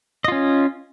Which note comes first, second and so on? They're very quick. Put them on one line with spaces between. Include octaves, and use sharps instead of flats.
D#5 F4 C#4